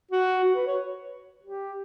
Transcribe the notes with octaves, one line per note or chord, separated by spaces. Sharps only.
F#4
F#4
B4
C#5
G4